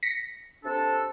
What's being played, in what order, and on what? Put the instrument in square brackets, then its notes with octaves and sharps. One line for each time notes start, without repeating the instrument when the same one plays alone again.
[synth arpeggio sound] A#6 B6 C#7
[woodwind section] C3 D4 A4